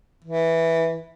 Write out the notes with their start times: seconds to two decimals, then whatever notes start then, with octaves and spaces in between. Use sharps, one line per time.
0.24 E3